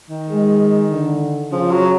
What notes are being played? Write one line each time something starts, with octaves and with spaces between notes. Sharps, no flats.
D#3
G#3
D3
C#3 F3
F#3